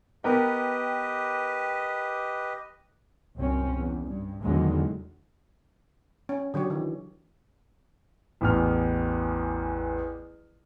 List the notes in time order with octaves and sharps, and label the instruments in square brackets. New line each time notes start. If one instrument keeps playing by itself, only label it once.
[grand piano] B3 A#4 G5 [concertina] G4 B4 D#5
[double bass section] C2 F#2 C4 C#4
E2
G2
E2 D3 D#3 F#3 G#3
[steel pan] C#4
D3 F#3 G4 C#5
D#3 E3
[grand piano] A1 E2 F6